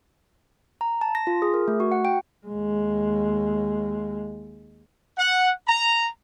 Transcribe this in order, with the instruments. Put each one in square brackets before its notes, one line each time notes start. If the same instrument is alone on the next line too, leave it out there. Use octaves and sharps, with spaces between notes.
[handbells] A#5
A5
A#6
F4
G#4
A#4
A3
F#4
F#5
G5
[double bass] D#2 G#3
[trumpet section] F#5
A#5